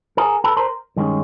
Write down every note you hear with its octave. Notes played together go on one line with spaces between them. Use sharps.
G#4 A#4
A4 B4
A#4 C5
G2 D#3 G#3 C#4